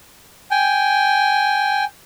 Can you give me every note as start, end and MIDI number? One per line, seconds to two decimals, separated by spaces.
0.51 1.84 79
0.51 1.84 80